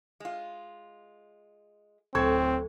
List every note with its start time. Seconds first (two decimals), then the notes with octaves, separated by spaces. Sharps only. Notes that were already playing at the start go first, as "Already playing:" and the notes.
0.20 G#3 F4
2.15 D1 C4 A4 C#6 G#6